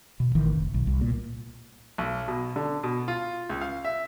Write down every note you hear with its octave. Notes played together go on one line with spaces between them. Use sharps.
B2
A1 D#3 E3
F1
B1
C2
A#2
B1
B2
D3
B2
F4
C#2
F5
E5